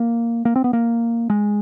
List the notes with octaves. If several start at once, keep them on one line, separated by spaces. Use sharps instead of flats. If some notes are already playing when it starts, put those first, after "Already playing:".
Already playing: A#3
A#3
C4
B3
A#3
G#3